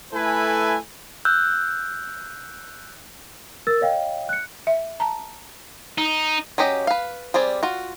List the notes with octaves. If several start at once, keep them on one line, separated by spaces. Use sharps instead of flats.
A3 E4 A4 B4 G#5
E6 F#6 G6
A#4 E6 A6
C#5 D#5 F5 G5
F#6 C#7
E5
A5 A#5
D#4
F#3 C#4 G4 D#5
B4 F5
G3 C4 G#4 D5
F4 F#4